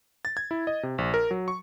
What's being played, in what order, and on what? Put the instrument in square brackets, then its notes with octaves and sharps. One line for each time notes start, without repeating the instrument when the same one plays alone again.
[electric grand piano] A6
G#6
E4
D#5
C3
A#1
A#4
F#3
C#6